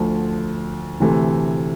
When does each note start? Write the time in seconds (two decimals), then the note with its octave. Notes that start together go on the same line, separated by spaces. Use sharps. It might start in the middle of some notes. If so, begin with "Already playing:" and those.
Already playing: D2 D3 F3 A3
1.00 D2 C3 E3 A3